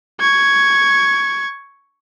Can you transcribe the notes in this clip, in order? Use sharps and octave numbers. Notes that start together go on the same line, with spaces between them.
C#6 G#6